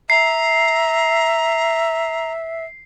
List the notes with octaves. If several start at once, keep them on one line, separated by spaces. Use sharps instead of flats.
E5 A#5 C7